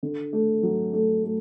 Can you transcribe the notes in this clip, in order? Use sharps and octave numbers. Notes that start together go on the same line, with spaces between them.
D3
A3
F#3
A3
A3